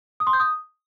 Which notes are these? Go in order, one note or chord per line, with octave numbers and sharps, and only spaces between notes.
D#6
C6
G6
D#6